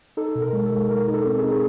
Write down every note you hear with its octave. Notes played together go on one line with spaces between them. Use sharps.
D#4 A4
B2 A4
A#4
G#3
A4
G#3
G#3 A#4
D#4
A4
C4
G#4
D#4
G#4